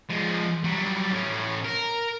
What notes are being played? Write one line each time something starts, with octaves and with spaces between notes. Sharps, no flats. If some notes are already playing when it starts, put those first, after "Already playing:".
F3 G#3
F#3 G3
A2 C#4
A#4